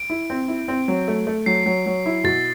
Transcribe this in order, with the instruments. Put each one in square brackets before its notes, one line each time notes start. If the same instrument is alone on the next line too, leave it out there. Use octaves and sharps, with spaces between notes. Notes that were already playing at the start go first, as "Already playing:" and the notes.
Already playing: [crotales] D7
[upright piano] E4
C4
E4
C4
F#3
A3
A3
[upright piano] F#3 [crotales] C7
[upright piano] F#3
F#3
E4
[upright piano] B2 [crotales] A6